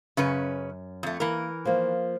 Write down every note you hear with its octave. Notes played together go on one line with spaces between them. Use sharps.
F#2 C#3 C#4 B4
F2 A3
E3 A#3 A#4
F3 A#3